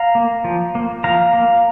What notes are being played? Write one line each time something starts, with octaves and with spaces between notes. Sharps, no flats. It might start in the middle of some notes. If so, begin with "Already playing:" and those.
Already playing: F5 A#5
A#3
F3
A#3
F3 F5 A#5
A#3